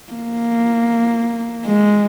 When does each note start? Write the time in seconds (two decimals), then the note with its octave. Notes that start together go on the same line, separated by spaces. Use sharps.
0.12 A#3
1.66 G#3